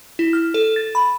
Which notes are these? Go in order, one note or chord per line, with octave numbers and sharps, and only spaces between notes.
E4
F6
A4
A6
B5